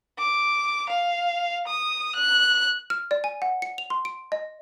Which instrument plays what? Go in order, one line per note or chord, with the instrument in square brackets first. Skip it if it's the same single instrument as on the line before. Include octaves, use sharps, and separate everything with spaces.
[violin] D6
F5
D#6
F#6
[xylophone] F6
D5
G#5
F#5
C#7
F7
C6
D7
D#5